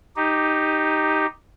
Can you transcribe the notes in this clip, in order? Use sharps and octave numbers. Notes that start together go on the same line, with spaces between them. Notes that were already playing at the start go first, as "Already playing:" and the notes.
D#4 G4